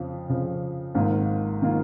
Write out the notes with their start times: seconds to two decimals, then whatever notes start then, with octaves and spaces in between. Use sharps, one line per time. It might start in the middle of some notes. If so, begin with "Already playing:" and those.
Already playing: F2 C#3 F3
0.29 F2 C#3 F3
0.95 G#1 G#2 D#3 A#3 F4
1.62 D#3 A#3 F4